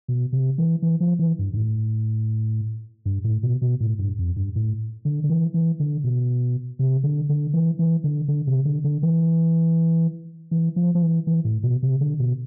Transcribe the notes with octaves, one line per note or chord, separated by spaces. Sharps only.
B2
C3
E3
E3
F3
E3
G2
G2
A2
G2
A2
B2
B2
A2
G2
F2
G2
A2
D3
D3
E3
E3
D3
B2
C3
D3
D3
E3
E3
D3
D3
C3
D3
D3
E3
E3
F3
F3
E3
E3
A2
B2
C3
D3
B2